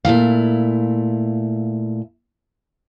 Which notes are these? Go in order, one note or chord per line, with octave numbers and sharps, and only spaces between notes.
A#2 A3 E4 F5